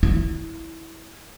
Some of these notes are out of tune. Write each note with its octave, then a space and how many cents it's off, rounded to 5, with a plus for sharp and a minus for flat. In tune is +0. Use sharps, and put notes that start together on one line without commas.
E4 -15